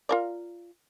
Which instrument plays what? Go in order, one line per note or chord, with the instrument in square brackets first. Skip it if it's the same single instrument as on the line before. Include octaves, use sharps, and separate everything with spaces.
[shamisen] F4 A#4 D5